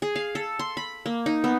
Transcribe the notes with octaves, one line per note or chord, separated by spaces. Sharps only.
G#4
F5
A4
C6
B5
A#3
D#4
B3